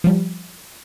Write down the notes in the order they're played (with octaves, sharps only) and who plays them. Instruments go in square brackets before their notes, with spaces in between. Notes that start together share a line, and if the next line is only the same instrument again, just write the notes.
[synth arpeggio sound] F3 G3